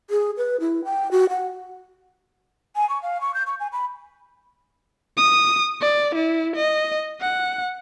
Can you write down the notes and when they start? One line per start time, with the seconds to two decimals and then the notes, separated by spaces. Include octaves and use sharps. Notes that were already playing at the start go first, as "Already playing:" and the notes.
0.10 G#4
0.37 B4
0.60 E4
0.85 G5
1.11 F#4
1.29 F#5
2.76 G#5
2.89 C#6
3.02 F5
3.21 C#6
3.34 G6
3.47 C#6
3.60 G#5
3.72 B5
5.17 D#6
5.81 D5
6.15 E4
6.56 D#5
7.21 F#5